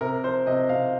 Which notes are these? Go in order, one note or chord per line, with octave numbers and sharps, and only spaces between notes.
C3 A#4
F3 C5
C3 D#5
C3 F5